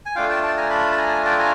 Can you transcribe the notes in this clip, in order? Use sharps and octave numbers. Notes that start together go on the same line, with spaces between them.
G#5
A3 D4 F4 F5 G5
G5 A5
G5 A5
G#5 A#5
A5 B5
A5
G#5 A#5
G5 A5
G#5 A#5